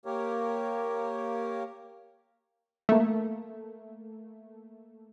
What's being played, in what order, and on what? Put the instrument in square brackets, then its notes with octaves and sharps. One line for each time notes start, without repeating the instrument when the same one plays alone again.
[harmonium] A#3 G4 A#4 C#5
[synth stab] A3 A#3